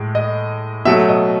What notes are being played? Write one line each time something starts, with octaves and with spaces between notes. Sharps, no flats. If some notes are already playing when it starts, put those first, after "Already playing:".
Already playing: A2 G#3
D#5
B2 F#3 A3 E5
D#5